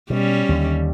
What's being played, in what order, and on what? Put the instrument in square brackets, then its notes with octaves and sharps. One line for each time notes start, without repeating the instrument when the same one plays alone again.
[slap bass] B2 [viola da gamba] G3 C#4
[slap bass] D#2 D3